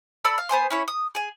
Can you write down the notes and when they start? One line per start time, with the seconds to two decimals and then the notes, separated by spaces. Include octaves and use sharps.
0.25 A4 D5 B5 E6
0.38 F5
0.49 B3 C5 G#5 C6
0.70 C#4 E4 C#5
0.88 D#6
1.15 G#4 G#5